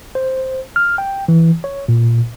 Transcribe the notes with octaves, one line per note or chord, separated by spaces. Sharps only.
C5
F6
G5
E3
C#5
A#2